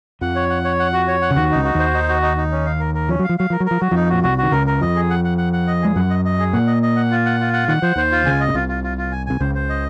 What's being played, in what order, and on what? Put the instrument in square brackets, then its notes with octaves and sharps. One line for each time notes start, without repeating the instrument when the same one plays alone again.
[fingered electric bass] F2 F3 [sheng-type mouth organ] F#5
[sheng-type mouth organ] C#5
F#5
C#5
F#5
F#4
C#5
F#5
[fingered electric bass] C#3
[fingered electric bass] D#2 D#3 [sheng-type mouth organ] F#4
[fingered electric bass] C#2 C#3 [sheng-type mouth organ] D#4
[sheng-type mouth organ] F#4
[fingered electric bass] D#2 D#3 [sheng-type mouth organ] C5
[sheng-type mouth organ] D#4
F#4
D#4
D#4
C#4
F5
A#4
A#4
[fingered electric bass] F3 [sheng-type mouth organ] C#4
[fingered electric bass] F#3 [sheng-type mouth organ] F5
[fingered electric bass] F3
[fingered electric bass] F#3 [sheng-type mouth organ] F5
[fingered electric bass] F3 [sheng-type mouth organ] A#4
[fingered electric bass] F#3
[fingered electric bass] F3 [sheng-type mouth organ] A#4
[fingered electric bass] F#3 [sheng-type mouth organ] F#4
[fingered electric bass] F2 F3 [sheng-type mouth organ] D#4
[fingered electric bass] A#2 [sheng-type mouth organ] F#4
[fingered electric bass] C2 C3 [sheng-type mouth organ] F#4
[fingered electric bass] D#3 [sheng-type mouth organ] F#4
[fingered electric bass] C#2 C#3 [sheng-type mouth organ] A#4
[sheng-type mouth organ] A#4
[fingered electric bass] F2 F3 [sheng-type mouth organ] D#5
[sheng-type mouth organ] G#4
F#5
F#5
F#5
F#5
D#5
[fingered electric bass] G#3 [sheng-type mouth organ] G#4
[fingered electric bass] F#2 F#3 [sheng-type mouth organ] F#5
[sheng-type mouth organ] D#5
D#5
G#4
[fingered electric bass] A#2 A#3 [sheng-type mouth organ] F#5
[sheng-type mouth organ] D#5
D#5
F#5
F4
F#5
F4
F#5
[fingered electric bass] D#3 [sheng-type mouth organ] F#5
[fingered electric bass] F3 [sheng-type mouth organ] C5
[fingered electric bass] D#2 D#3 [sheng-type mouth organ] C5
[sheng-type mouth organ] F4
[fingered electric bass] C#2 C#3 [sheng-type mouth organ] G#5
[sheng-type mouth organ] D#5
[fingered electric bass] A#2
[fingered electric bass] C2 C3 [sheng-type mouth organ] F4
[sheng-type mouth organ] F4
F4
F4
G#5
[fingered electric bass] C3 [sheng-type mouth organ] G#5
[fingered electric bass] C#2 C#3 [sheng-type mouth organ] C5
[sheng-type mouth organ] C5
D#5